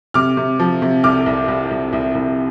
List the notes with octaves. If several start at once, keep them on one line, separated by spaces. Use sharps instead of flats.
C3 D6 F6
C3
F3
C3
C2 D6 F6
C2
C2
C2
C2
C2